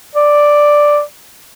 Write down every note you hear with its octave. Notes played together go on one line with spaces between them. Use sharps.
D5